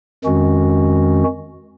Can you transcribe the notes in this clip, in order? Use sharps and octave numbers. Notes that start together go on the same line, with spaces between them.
F2 D#3 G#3 C#4 F#4